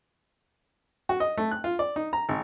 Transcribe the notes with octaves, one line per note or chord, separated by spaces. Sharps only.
F#4
D#5
A3
F#6
F4
D5
D#4
A#5
G#1